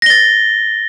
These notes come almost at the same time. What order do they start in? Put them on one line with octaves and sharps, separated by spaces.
A#6 G7 A6